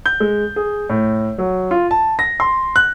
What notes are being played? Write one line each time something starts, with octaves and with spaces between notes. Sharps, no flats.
G6
G#3
G#4
A2
F#3
F4
A5
A#6
C6
F#6